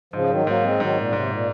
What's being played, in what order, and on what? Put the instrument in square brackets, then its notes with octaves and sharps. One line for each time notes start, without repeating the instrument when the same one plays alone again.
[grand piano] G#2 [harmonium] C#3 F3
[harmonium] D#3 F#3
[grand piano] G#2 [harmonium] F#3 A#3
[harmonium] G#3 C4
[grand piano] G#2 [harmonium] D#3 F#3
[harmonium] A#2
[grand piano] G#2 [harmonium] C3
[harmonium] A#2